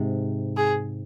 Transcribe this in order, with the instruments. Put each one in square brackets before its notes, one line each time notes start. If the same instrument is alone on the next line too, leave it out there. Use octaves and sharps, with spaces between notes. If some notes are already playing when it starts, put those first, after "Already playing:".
Already playing: [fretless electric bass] G#2 C3
[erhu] G#4